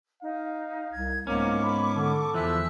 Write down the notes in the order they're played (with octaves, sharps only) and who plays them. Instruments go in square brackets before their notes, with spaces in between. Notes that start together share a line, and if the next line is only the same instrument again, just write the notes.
[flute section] D#4 [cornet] F5
[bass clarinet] C2 [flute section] G#6
[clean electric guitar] G#2 C#4 [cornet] A#3 [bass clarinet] B3 [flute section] C#6 D6
[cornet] B5
[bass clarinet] D3 [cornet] A4
[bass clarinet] E2 [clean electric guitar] E3 F3 [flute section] E5 E6 F#6